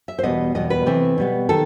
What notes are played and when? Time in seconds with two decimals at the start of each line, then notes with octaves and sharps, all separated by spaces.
0.08 E5
0.19 C5
0.23 E2 B2 G3 B3 D#5
0.55 E2 B2 G3 B3 D#5
0.70 B4
0.86 C3 E3 A3 C4
1.18 B2 G3 B3
1.49 D#3 A4